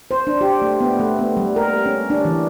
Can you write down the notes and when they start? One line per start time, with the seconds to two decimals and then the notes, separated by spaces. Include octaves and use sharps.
0.11 C5
0.27 D4
0.41 G4
0.62 A3
0.81 B3
1.00 A3
1.19 B3
1.37 G3
1.56 A#4
1.86 C#4
2.10 D4
2.25 E3